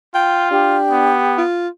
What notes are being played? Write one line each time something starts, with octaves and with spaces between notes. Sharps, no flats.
F4 G5
D4 G4
B3
F4